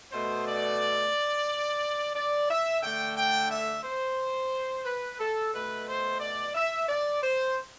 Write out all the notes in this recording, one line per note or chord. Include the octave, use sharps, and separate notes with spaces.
B2 A3 C5
D5
D5
E5
D3 A3 G5
G5
E5
C5
B4
A4
B2 A3 B4
C5
D5
E5
D5
C5